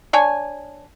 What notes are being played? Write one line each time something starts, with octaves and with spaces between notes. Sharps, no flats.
D4 C#5 G#5